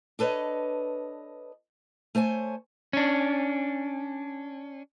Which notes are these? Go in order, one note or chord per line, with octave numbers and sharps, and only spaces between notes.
D4 A4 B4 C#5 D#5
A3 C5 C#5 G#5
C#4 D4